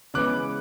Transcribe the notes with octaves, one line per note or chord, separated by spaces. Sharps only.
C#3 E3 G#3 B3 D6 F#6